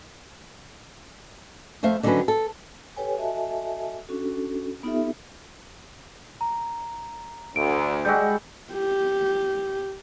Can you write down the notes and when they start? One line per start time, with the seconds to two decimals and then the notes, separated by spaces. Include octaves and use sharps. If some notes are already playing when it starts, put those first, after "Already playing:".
1.83 F2 A3 C5 E5 F5
2.03 D3 D#3 F#3 C4 C#4 B4
2.28 A4
2.96 G4 A4 B4 C#5 G5 G#5
3.17 F#4 A4 D#5 E5 G#5 A5
4.09 C#4 D4 F#4 A4
4.83 B3 D#4 F4 G4 A4 E5
6.41 A#5
7.56 D2 D7
8.05 G3 G#3 F#4 E6 G6
8.73 G4